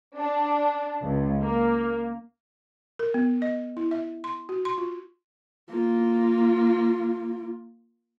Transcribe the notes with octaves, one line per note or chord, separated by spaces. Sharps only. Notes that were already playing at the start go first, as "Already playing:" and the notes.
D4
C#2
A#3
A#4
B3
D#5
E4
E5
C6
F#4
C6
F4
A#3 F4